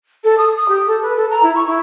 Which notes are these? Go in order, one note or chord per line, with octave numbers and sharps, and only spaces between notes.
A4
D#6
D#6
G4
A4
B4
A4
A#5
E4
C#6
E4